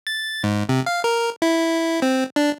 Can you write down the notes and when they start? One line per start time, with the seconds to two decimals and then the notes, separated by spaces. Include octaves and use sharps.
0.07 A6
0.44 G#2
0.69 C3
0.86 F5
1.04 A#4
1.42 E4
2.02 C4
2.36 D4